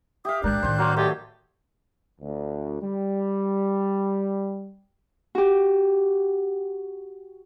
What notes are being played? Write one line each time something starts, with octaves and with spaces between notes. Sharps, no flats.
G4 E5 F5 D#6
A1 G#3 D4 A#4 F#6 G6
A2 D#3 C5
F#3 A#3 C5
A3 D#4 G4 D5 G#6
D2
G3
F#4 G4